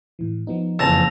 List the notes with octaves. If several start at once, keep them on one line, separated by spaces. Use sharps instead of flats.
A2 E3
F3 B3 D#4
F#1 F2 E3 A5 E6 A#6 F7